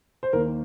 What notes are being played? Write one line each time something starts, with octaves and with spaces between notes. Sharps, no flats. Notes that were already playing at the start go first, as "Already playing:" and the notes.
C5
D#2 D#3 A#3 A#4